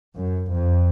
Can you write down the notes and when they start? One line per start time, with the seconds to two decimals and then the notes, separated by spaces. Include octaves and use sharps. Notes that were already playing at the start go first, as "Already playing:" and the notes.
0.16 F#2
0.52 F2